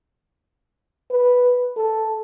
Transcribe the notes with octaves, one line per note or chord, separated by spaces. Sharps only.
B4
A4